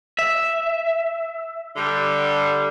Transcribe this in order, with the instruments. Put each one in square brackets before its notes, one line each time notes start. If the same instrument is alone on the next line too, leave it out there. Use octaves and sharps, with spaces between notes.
[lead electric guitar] E5
[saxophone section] D3 G3